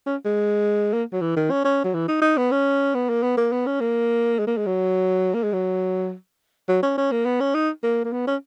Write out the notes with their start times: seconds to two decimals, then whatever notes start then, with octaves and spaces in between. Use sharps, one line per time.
0.06 C#4
0.25 G#3
0.93 A#3
1.13 F#3
1.21 E3
1.36 D#3
1.51 C#4
1.65 C#4
1.84 F#3
1.94 E3
2.08 D#4
2.22 D#4
2.37 B3
2.51 C#4
2.94 B3
3.09 A#3
3.23 B3
3.37 A#3
3.52 B3
3.66 C#4
3.80 A#3
4.39 G#3
4.47 A#3
4.57 G#3
4.66 F#3
5.34 A#3
5.43 G#3
5.53 F#3
6.68 F#3
6.83 C#4
6.97 C#4
7.12 A#3
7.25 B3
7.40 C#4
7.55 D#4
7.83 A#3
8.04 A#3
8.12 B3
8.27 C#4